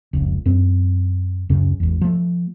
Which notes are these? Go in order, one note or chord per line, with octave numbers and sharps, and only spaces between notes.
F1 C#2
F#2 C4
D1 F#2 C#3 C#4
G#1 E2
F3 A3